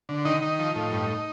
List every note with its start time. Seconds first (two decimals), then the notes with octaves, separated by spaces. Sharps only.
0.09 D3
0.25 D#3 D#4
0.42 D#3
0.59 F3
0.75 A2
0.92 G2